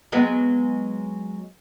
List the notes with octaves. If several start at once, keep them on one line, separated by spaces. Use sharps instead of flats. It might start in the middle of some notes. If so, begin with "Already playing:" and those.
F#3 G#3 B3